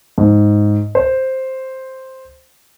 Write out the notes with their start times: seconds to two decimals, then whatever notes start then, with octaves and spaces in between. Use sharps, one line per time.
0.18 G#2
0.95 C5